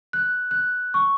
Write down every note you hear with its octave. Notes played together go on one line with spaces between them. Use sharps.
F#6
F#6
C#6